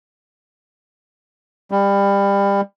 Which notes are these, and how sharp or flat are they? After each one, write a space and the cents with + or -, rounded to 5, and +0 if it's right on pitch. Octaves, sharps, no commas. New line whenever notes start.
G3 +25